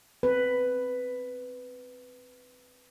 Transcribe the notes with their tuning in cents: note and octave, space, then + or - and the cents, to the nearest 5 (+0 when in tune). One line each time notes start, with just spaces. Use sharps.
C4 +0 B4 +10